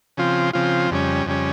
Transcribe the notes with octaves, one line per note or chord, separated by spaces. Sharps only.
C#3 F3 C4 F4
C#3 F3 C4 F4
F2 C#3 G3 C#4
F2 C#3 G3 C#4